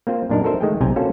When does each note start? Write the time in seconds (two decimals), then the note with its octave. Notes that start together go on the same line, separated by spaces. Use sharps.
0.07 A#3 C4 F4 C5
0.29 F#2 A#2 D4 D#4 A#4
0.43 F#4 A4 A#4 C5 E5
0.60 D#3 G#3 A3 G#4 G5
0.81 B1 C3 G5 G#5 A#5
0.96 A#3 C#4 F4 F#4 A4 C5